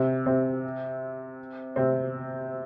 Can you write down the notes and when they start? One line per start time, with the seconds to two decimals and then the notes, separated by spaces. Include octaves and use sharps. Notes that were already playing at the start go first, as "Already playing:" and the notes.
Already playing: C3 C4
0.26 C3 C4
1.76 C3 C4